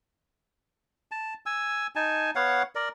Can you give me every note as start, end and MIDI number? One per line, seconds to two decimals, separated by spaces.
1.12 1.34 81
1.46 1.87 80
1.46 1.87 88
1.96 2.31 63
1.96 2.31 80
1.96 2.31 81
2.35 2.63 59
2.35 2.63 73
2.35 2.63 77
2.35 2.63 78
2.75 2.89 70
2.75 2.89 74